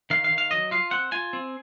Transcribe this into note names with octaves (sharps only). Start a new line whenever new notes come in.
D#3 F5
F5
D#3
F5
F#3 D#5
F4 F5
C4 F#5
F4 G#5
C4